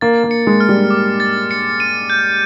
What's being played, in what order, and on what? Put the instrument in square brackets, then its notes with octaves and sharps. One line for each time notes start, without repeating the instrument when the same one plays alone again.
[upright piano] A#3 [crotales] A6
[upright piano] A#3
[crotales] C#7
[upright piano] G#3
[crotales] F6
[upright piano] G3
[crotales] D6
A6
C#7
D#7
G6